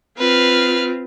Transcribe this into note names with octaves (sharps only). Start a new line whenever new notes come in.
C4 F4 B4 F6